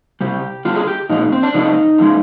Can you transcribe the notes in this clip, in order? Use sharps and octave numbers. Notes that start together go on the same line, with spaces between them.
C3 G3 G4
D3 G3 F4
G#4
G4
A#2 F3 G#3 D#4
C4
D4
C3 F3 G#3 D#4
D3 F3 G#3